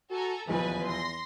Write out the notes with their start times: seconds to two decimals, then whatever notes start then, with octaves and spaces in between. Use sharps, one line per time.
0.11 F#4 A4 G#5 A#5
0.48 D#1 B1 E2 F3 B4 G#5
0.86 C6 A#6